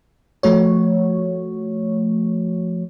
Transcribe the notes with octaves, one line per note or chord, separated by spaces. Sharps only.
F3 A3 F#4 C#5